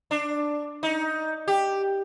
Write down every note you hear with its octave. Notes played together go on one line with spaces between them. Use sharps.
D4
D#4
G4